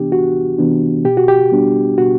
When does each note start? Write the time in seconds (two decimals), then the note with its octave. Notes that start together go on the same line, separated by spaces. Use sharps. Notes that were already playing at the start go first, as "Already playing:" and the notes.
Already playing: C2 C3 E3 B3 D4 G4
0.12 C2 F#4
0.58 C3 E3 B3 D4
1.05 B2 G4
1.17 F#4
1.28 G4
1.52 G3 B3 D4
1.98 B2 F#4